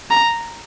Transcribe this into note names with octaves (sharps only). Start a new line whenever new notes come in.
A#5